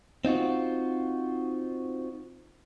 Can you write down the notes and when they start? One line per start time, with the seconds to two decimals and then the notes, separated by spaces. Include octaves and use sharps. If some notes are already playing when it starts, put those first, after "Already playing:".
0.25 C4 D#4 F4 F#4